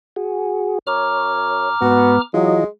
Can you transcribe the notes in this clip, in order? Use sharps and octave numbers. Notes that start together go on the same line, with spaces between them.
F#4 G#4
F#2 C#5 A#5 D6 F6
G#2 B3 F#4
E3 F#3 G#3 F4 D#5